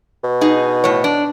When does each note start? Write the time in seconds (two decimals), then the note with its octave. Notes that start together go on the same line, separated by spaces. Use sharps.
0.24 B2
0.41 D#4 G#4
0.84 A2 C#5
1.04 D4